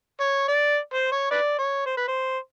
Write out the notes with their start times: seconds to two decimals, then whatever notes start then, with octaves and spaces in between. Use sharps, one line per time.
0.20 C#5
0.48 D5
0.94 C5
1.12 C#5
1.31 B4 D5
1.59 C#5
1.86 C5
1.97 B4
2.08 C5